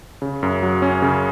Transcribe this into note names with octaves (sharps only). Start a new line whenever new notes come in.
C#3
F#2
F#3
C#4
C#3